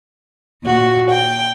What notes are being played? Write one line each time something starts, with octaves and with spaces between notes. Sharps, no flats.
D#2 A#2 F#4
G5